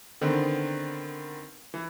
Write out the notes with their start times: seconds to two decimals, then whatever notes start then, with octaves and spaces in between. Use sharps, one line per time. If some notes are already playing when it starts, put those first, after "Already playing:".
0.21 D3 D#3 B3 C4
1.74 E3